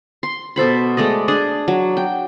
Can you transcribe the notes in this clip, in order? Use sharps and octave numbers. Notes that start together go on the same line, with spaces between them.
C6
B2 A4 C5 B5
G#3 A3 D5 D#5
D4 G#4 D5
F#3
G5